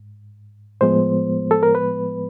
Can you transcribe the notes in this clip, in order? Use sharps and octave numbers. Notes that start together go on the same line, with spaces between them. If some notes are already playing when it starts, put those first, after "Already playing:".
Already playing: G#2
A2 F3 G#3 B3 C5
A4
A#4
B4